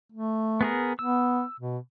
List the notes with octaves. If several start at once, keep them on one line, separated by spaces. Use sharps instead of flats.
A3
B3 G#4 A#4
B3 E6
B2